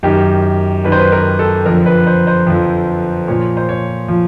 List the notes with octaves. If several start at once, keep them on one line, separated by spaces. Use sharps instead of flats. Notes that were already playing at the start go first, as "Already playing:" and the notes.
F#2 D#3 G4
F#2 D#3 B4
C5
B4
A#4
A4
F2 D3 F3 A#4
B4
C5
C5
F2 D3 F3
A#2 F3 C#5
C5
C#5
F3